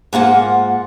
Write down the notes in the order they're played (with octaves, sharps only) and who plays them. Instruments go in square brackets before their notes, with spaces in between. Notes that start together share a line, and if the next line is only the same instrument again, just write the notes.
[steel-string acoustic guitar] G#2 A#3 F4 F#5